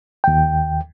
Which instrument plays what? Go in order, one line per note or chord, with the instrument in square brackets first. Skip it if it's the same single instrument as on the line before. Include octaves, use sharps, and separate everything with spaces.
[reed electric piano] D#2 G5